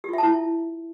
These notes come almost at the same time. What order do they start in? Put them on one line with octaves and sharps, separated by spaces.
G4 F4 E5 A5 E4